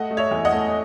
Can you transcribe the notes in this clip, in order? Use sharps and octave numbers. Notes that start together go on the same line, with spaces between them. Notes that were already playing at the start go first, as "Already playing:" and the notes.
Already playing: A3 D#5 F#5
A3
C#5 E5
E2
D#5 F#5
A3